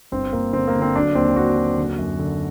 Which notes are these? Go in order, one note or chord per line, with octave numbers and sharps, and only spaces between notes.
G1 C4
G1 A#3
D3 C4
A#3
D3
C4
F#3 D4
D#2 C4
D#2 F#4
F#3
D3
F#2
D3